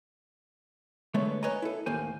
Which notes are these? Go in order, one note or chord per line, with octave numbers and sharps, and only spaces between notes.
D3 G#3 A3 B3 C#5
B4 C#5 D#5 G#5 A#5
E4 A4
D#2 A2 A#3 C5 G#5